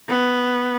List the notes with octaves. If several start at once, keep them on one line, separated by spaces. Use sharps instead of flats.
B3